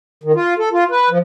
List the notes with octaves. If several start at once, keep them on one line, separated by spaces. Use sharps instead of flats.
D#3
F4
A4
F4
B4
F3